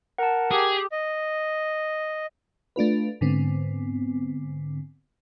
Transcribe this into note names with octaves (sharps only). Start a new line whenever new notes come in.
A#4 F#5 A5
G4 G#4 D#6
D#5
A3 D4 F4 B4
G#2 D3 B3 C4